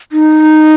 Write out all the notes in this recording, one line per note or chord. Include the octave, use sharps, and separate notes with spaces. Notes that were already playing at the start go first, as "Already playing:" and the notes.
D#4